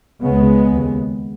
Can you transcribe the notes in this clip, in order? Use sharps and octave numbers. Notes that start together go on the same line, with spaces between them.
C#2 C#3 G#3 B3
D#2 C#3